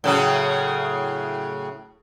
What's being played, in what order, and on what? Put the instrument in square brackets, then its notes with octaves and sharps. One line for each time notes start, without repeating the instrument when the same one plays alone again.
[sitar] A2 C#3 F#3